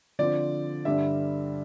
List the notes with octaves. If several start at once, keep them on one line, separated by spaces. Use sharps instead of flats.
D3 F3 C4 D5
G2 D3 G3 D4 E5